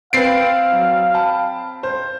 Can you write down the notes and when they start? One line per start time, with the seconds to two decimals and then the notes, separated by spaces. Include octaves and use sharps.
0.13 C4 B4 F5 G5 A6 C7 D7
0.72 F#3
1.14 G5 A5 B5
1.83 C5